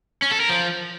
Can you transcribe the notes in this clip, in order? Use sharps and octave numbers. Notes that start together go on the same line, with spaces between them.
C#4
A4
A#4
F3